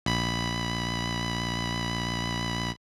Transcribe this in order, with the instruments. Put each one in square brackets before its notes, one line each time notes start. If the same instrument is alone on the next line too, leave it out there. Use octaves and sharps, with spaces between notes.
[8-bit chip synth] A#1 B5